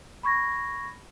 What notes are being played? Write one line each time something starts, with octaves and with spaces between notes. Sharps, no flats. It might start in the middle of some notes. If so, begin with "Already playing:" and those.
B5 C#6 G#6 A#6